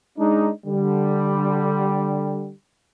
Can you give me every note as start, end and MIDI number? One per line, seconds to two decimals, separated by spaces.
0.18 0.50 56
0.18 0.50 62
0.18 0.50 63
0.66 2.52 50
0.66 2.52 55